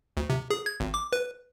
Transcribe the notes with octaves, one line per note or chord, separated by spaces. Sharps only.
D2
C3
G#4
G#6
G#1
D6
B4